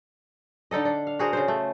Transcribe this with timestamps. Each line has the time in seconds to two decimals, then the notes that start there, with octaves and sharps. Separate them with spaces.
0.71 D3 D#4 A4 D#5
0.85 D4
1.07 F5
1.19 F#4 G#4 A#4 C5
1.33 C#3 C5
1.48 A3